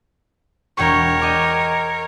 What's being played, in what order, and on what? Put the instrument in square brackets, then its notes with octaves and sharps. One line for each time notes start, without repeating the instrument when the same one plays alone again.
[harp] E1 G5 C#6 [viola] A#4 C#5
[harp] D#5 G5 D6